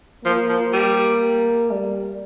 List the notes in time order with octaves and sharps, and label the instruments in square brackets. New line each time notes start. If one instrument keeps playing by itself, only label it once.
[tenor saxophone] F3 [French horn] A#3
[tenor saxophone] F3
G3
[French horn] G3